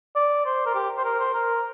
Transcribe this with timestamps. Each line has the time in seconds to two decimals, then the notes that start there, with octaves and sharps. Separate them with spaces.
0.16 D5
0.45 C5
0.66 A#4
0.75 G4
0.98 C5
1.05 A#4
1.20 C5
1.34 A#4